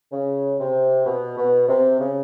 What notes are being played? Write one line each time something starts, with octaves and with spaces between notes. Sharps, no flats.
C#3
C3
B2
B2
C3
C#3